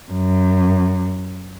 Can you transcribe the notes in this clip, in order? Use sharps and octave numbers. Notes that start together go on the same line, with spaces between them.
F#2